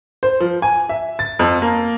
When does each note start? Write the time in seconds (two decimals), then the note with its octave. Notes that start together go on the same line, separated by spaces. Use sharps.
0.23 C5
0.40 F3
0.62 G#5
0.89 E5
1.19 A6
1.39 F2
1.62 A#3